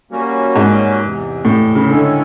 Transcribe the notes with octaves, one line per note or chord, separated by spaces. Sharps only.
G3 A#3 C#4 F#4
G#2
E2 C3 E3
A2
C#3
D3 D#3 G#3 C#4 E4 A4